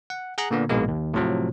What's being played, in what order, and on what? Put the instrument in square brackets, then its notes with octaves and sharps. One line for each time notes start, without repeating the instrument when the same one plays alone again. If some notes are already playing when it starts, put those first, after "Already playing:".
[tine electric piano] F#5
G#4 F#5 A#5 F#6
A#2 D3 A#3 B3
A#1 G#2 B2 G#3 A#3
D#2
A2 C3 F3 F#3